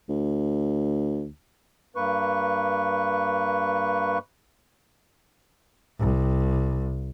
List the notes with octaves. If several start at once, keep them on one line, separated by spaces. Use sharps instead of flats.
D2
G2 A#3 B4 C#6
C2